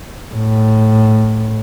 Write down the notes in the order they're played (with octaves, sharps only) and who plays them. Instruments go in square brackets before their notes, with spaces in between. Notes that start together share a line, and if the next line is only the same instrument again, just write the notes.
[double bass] A2